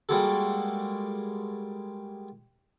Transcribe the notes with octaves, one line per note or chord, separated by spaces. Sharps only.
G3 G#3 A#3 F#4 A4